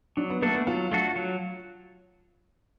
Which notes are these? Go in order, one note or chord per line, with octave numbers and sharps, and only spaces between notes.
F#3 D4
B3
A3 A#3 D4 F#4 A4
B3
F#3 F4
A3 D4 F#4 A4
F#3